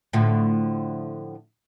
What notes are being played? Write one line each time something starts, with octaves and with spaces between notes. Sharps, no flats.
A2 D3 F3